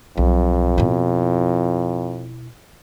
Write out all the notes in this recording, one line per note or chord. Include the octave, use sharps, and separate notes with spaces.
B1 F2
B2 E4